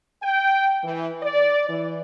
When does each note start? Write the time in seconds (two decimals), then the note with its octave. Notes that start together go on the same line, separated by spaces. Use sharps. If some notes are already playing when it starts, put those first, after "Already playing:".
0.22 G5
0.83 E3
1.22 D5
1.69 E3